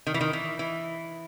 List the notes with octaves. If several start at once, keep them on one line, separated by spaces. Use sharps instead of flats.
D#3
E3
D#3
E3
E3